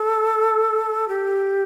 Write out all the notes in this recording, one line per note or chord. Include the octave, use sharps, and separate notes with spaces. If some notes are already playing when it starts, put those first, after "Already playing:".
Already playing: A4
G4